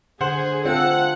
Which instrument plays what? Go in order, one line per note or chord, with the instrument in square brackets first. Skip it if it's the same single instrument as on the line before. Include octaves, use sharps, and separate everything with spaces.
[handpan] D3 [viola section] G#4 [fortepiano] C5 F#5
[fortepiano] C4 [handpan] F4 A4 [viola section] F#5